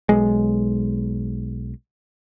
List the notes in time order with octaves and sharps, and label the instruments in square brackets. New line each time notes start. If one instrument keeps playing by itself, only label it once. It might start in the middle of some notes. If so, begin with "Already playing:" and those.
[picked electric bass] B1 G#3